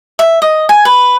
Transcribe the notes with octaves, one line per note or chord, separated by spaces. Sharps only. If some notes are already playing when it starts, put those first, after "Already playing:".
E5
D#5
G#5
B4